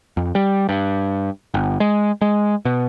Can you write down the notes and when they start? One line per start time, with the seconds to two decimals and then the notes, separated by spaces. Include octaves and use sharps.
0.17 F2
0.35 G3
0.69 G2
1.54 G1
1.80 G#3
2.22 G#3
2.65 B2